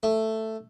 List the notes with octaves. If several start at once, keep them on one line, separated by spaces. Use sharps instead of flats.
A3